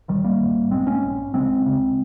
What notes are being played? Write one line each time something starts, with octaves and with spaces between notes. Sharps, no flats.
A#1 G#2 D#3 G3
G3 A#3
A#1 G#2
A#1 G#2 G#3 C4
A#3 C#4
A#1 G#2
C#2 C#3 G#3 C4
C#2 C#3